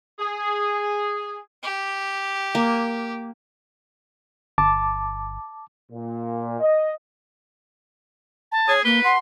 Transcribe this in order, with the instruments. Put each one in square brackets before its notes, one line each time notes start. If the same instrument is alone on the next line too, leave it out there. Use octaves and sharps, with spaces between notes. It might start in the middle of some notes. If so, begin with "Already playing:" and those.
[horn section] G#4
[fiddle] G4
[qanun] A#3
[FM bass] G1 [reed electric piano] A5 D6
[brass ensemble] A#2
D#5
[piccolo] A5
[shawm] G#4 [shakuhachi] C#5
[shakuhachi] A#3 [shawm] B4 [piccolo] G7
[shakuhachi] F#5 [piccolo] C6